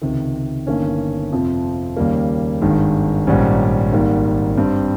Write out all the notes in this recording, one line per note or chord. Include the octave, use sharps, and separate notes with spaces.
C#2 C3 D#3
G1 G2 D#3 A#3 C#4
F2 C3 F3
D#2 C#3 G3 A#3
G#1 G2 D#3 G#3
A#1 G#2 D#3 G3 C#4
G#1 G#2 D#3 G3 A#3
G2 G3 C4